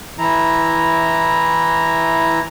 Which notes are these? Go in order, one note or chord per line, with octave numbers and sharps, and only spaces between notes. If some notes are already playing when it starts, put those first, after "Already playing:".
E3 E4 A#5